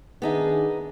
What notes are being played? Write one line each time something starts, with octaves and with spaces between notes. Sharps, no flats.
D#3 B3 D4 D#4 G#4 E5